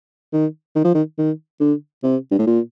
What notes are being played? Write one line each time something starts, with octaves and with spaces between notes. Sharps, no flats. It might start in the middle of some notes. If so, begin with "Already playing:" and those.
D#3
D#3
F3
D#3
D#3
D3
C3
G2
A2
A#2